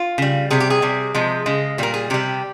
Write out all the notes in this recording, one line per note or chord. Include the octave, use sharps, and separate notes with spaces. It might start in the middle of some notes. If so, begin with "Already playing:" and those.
Already playing: F4
C#3 G3
C3 G3 G#4
G4
G#4
C3 G3
C3 F3 G#3
C#3 G#3
A#2 G3 A#4
G#4
C3 G3 G4